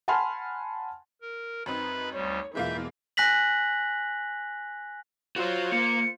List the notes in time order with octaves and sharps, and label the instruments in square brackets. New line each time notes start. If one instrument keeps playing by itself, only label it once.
[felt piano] F#5 G#5 A5 B5 C6 F6
[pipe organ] A#4
[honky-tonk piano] F#2 C4 D#4 [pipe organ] B4 B5
[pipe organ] D2 G3 [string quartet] C#5
[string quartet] E2 B2 E3 [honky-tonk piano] G#3 A#3 F4 [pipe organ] E5 G6
[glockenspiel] G#5 F#6 A#6 B6 F#7
[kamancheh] F4 C5 [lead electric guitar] F#4 C#5
[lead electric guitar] A#3 [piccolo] C#7